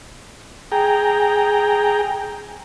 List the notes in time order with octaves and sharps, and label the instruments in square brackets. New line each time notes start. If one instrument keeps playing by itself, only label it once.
[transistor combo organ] G#4 G5 A#5